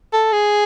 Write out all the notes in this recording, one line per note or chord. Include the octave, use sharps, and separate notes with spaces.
A4
G#4